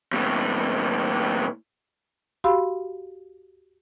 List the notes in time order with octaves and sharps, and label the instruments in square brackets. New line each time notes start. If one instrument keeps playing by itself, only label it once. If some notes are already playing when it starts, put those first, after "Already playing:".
[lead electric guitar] D#2 A2
[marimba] F#4 G4 F5 B5 C6 E6